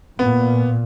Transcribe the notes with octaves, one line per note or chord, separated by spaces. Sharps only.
A#2 B3